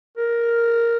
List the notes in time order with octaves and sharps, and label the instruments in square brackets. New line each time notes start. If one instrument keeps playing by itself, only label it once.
[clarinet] A#4